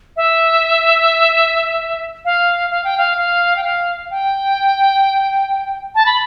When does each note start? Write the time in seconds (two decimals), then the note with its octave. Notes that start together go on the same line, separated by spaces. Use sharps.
0.16 E5
2.25 F5
2.70 F5
2.84 G5
2.97 F5
3.18 F5
3.56 G5
3.64 F5
4.10 G5
5.95 A5
6.06 B5